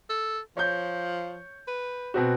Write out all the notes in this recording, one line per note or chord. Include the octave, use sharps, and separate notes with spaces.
A4
F3 C#5 G6
B4
B2 C4 F#4